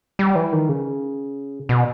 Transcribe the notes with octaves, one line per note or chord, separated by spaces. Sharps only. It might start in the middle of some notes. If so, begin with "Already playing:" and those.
G3
E3
D#3
C#3
B2